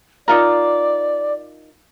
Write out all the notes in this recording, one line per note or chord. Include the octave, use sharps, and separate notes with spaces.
D#4 F4 A#4 D5